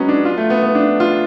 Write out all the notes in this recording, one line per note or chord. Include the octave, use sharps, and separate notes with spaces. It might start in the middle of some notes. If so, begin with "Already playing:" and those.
Already playing: F#3 G#3 B3 C#4 G#4
D4
F4
A3
B3
B3
D4
F4